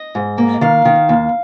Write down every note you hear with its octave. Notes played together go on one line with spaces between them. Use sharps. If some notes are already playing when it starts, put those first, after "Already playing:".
Already playing: D#5
G#2
A#3
D#3 F5
D#3
D#2